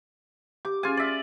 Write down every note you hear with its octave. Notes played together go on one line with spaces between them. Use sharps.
G4 D6
C#4 F4 G#4 G#5
D5 E5